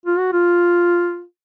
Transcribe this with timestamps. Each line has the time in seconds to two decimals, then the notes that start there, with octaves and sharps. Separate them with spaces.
0.05 F4
0.18 F#4
0.32 F4